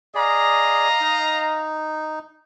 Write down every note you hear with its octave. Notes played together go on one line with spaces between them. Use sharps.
G#4 D5 D#5 F5 A#5
D#4